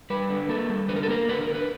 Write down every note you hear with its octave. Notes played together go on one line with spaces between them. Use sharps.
G3 B4
D3
A#3 A4
G3
D3 B4
A#4
A4
A#3 A#4
D3 B4
A#4
D3
B4